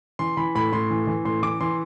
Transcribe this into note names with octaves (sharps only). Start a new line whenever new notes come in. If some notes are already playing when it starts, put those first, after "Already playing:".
E3 C6
E3 B5
A2 B5
A2 C6
E3
E3
A2 C6
E3 D6
E3 C6